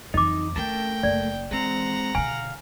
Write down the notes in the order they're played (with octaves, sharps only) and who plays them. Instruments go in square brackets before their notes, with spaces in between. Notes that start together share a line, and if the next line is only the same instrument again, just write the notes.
[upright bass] F2 E3 [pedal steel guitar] D#4 [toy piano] D#5 D6
[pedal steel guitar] A3 A#4 A5 [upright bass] C#4 D4 [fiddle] G5
[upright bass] F#1 [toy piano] D5
[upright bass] E3 [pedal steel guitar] G#3 C4 [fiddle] F#5 A#5
[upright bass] B2 D3 [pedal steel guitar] F5 [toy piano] G#5